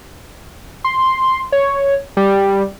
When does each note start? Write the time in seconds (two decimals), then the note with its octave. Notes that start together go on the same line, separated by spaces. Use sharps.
0.84 C6
1.52 C#5
2.17 G3